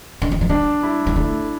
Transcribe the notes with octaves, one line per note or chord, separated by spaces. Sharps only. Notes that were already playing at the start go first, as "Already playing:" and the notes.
D3
E3
F3
G3 D4
E4
G3
A3 E4